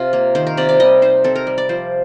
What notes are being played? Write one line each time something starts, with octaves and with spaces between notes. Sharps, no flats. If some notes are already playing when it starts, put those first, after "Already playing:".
Already playing: C3 F4
A#3
D#3 C5
A#4
C3 D5
D5
G3 D#5
D#4 C5
C4 A4
A#4
G3
D5
F3 C5